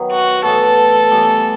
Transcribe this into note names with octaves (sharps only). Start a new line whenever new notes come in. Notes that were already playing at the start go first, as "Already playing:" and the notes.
Already playing: D#3 F#3 B3 E4
F#4
A2 E3 B3 E4 A4
A2 E3 G3 B3